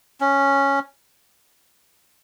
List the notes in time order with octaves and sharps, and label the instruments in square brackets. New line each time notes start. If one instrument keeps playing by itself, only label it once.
[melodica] C#4